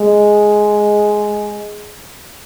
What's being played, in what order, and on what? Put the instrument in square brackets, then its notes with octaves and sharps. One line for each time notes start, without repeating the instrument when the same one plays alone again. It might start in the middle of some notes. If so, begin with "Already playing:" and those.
Already playing: [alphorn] G#3